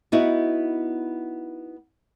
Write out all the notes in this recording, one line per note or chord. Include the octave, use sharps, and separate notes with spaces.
B3 D#4 E4 F#4